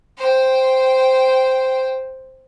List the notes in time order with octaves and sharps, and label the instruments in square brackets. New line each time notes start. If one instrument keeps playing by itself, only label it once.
[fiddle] C5 G5